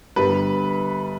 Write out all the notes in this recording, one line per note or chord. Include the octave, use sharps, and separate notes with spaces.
G1 G2 G3 B4